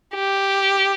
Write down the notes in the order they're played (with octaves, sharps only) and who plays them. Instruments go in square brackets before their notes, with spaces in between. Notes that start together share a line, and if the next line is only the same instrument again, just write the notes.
[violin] G4